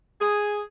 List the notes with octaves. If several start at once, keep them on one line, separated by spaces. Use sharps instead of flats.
G#4